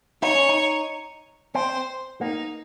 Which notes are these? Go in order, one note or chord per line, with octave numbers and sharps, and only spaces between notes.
D#4 C#5
C#4
D#4
C4 C5
A#3 D#4